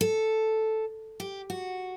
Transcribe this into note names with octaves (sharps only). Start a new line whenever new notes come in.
A4
G4
F#4